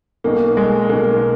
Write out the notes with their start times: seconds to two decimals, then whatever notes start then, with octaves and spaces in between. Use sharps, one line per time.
0.24 B1 B2 A#3
0.57 G#3
0.89 B1 B2 A#3